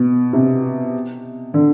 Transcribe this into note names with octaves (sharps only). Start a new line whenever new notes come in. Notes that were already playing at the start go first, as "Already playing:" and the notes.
Already playing: B2
C3
D3